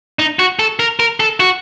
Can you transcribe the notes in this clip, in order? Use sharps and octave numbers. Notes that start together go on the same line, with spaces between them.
D#4
F#4
A4
A#4
A#4
A4
F#4